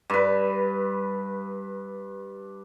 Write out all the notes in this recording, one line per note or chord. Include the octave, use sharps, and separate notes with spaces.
G2 B4